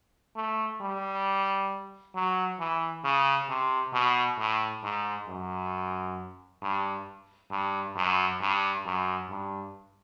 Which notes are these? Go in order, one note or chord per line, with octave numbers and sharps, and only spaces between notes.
A3
G3
F#3
E3
C#3
C3
B2
A2
G#2
F#2
G2
G2
F#2
G2
F#2
G2